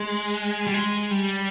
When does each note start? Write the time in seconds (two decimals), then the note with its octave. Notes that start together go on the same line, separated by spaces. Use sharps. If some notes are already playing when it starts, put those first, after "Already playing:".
Already playing: G#3
0.67 G3
0.74 G#3
1.11 G3